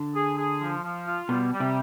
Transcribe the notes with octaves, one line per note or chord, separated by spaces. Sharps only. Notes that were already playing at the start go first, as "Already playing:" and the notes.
Already playing: D3
G#4
G#4
F3
F3
F4
B2 G3
G3
C3